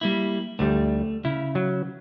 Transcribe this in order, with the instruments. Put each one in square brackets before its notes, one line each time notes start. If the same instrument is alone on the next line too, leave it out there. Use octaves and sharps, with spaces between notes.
[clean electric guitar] G3 A#3 E4
[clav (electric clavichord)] D2 G3 [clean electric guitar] A3
[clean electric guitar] C#3 [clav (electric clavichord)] E4
[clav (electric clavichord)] F#3